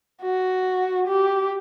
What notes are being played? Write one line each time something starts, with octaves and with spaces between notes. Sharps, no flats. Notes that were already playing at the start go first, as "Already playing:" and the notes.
F#4
G4